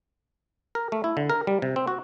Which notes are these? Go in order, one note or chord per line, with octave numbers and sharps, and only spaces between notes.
A#4
A3
E4
D3
A#4
G3
C3
C4
F#4